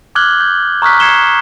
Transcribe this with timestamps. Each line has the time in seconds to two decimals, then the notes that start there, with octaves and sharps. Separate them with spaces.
0.15 D6 F6 F#6 G#6 F#7 G7
0.40 G6
0.82 A#5 C#6 D#6 F6 F#6 B6
1.00 F6 G#6 C7 C#7 E7 G7